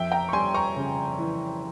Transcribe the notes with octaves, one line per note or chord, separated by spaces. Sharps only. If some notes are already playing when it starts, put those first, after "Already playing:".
Already playing: F2 E5 G5
G5 A#5
C#6
G3 G#5 C6
A#5 C#6
C#3
E3